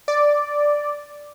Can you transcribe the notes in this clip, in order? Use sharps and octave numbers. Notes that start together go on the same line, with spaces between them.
D5